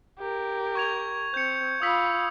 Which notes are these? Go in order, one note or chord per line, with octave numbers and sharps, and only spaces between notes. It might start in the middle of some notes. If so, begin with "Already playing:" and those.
G4 A#4
C#6 G#6 F7
C4 G6 C#7
F4 B5 D#6 E6 B6